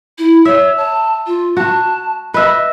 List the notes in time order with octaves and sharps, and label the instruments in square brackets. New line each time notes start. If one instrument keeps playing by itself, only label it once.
[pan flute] E4
[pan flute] C#5 [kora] E5
[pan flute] A5
F4
[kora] F#4 [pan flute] A5
[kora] B4 E5 [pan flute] D#5